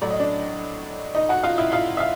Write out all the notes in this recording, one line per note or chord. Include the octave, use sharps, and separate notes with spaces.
A2 F#3 A3 D5
D#5
D4 D5
D#4 D#5
F#4 F#5
F4 F5
E4 E5
F4 F5
E5
F5